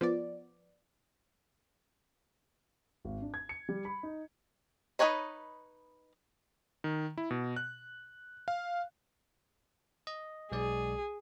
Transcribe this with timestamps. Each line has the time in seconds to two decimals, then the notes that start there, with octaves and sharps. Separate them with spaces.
0.01 F3 B3 D5
3.05 G#1
3.22 D4
3.34 G#6
3.49 C#7
3.69 G3
3.85 B5
4.03 D#4
4.99 D#4 G#4 B4 C#5 D#5
6.84 D#3
7.18 E4
7.31 B2
7.56 F#6
8.48 F5
10.07 D#5
10.52 B1 G#3 G#4 D5